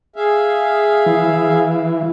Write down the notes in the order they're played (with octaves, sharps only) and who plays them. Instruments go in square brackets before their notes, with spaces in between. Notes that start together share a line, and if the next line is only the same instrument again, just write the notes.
[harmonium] G#4 E5 F5
[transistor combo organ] E3